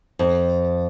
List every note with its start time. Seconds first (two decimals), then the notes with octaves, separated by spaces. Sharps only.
0.19 F2